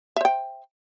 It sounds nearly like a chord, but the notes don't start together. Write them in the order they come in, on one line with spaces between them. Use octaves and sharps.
E5 C5 G5